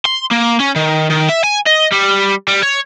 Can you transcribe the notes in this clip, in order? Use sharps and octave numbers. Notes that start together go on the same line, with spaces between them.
C6
A#3
C#4
D#3
D#3
E5
G#5
D#5
G3
G3
C#5